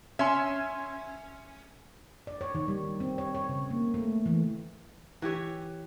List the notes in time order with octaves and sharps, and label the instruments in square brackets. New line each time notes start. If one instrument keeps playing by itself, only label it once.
[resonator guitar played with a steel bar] C#4 [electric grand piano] E5 G#5 C6
[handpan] D5
C#5
D#3
G3
C4
C#5
C#5
C#3
A#3
A3
E3
[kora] E3 G4 C#5 E5